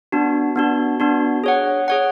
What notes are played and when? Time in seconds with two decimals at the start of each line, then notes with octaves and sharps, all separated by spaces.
0.12 B3 D4 F#4
0.56 B3 D4 F#4
1.00 B3 D4 F#4
1.44 G#4 C#5 F#5
1.88 G#4 C#5 F#5